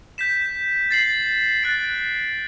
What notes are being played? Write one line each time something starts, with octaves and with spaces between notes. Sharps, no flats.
G6 B6 E7
A6 C7 F#7
F#6 A6 D7